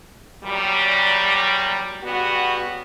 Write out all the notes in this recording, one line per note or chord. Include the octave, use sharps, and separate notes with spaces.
E2 A#2 F#3 G3
C#3 G3 B3 F#4